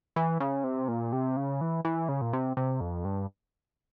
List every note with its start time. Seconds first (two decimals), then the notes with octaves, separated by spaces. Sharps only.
0.16 E3
0.40 C#3
0.64 C3
0.88 A#2
1.13 C3
1.37 C#3
1.61 E3
1.85 E3
2.09 C#3
2.21 A#2
2.33 C3
2.57 C3
2.81 F2
3.05 G2